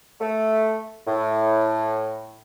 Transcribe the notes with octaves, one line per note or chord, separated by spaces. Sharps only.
A3
A2